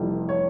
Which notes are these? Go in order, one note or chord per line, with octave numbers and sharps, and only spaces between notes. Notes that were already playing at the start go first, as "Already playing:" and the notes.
Already playing: F1 F2 E3 G3
C#5